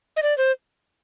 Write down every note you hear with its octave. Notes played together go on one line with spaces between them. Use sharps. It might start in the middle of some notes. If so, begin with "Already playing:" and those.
D#5
D5
C5